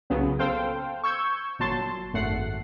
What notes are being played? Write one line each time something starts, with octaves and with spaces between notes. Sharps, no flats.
C2 A#2 C#3 F#3 B3
A4 C5 F5 G5
C#6 E6 G6 G#6
G1 A#2 F#3 A5 C6
G#1 F#2 A3 F#5 C7